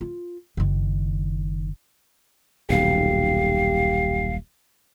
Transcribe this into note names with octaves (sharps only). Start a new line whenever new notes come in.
F4
F#1 D#3
D#1 B1 G4 F5